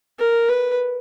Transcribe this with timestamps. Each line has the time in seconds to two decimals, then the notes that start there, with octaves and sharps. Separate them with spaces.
0.19 A#4
0.49 B4